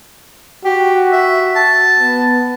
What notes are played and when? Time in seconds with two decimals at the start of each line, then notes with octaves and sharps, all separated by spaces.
0.65 F#4 G4
1.12 E5
1.56 A5
2.00 B3